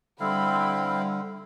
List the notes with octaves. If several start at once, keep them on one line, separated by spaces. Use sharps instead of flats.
D3 G3 C4 E4 F5 G5 B5